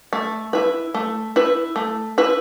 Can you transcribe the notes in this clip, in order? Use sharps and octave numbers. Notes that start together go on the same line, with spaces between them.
A3
E4 B4
A3
E4 B4
A3
E4 B4